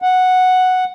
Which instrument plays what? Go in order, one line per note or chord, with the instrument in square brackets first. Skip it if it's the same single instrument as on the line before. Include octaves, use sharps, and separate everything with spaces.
[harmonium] F#5